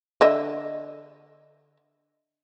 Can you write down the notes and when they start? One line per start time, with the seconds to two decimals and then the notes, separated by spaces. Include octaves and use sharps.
0.21 D3 D#5 E5